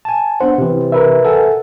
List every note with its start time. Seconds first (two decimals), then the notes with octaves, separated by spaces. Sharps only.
0.05 G#5 A5
0.41 B3 D4 C5 F#5
0.58 C3 E3
0.92 A#4 B4 E5
1.25 A4 F#5 G#5